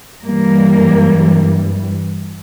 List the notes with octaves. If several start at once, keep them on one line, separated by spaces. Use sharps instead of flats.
G2 E3 G3 A#3